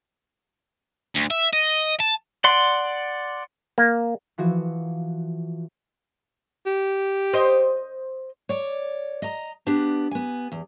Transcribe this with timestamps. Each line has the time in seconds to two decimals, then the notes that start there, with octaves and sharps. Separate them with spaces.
1.15 D2
1.31 E5
1.53 D#5
2.00 A5
2.44 D5 F#5 C6
3.78 A#3
4.38 E3 F3 F#4
6.66 G4
7.33 C5 D#5
8.49 C#5 D5
9.22 D#5 A#5
9.67 B3 D4 G4
10.11 B3 G#5
10.52 E2